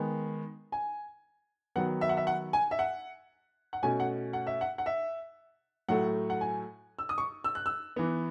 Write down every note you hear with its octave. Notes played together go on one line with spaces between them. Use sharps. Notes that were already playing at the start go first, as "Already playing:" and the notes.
Already playing: D#3 G#3 B3
G#5
D#3 F#3 B3 F#5
E5
F#5
E5
F#5
G#5
E5
F#5
F#5
B2 A3 C#4 G#5
F#5
F#5
E5
F#5
F#5
E5
A2 F#3 A3 F#5
F#5
G#5
E6
D#6
C#6
E6
F#6
E6
E3 B3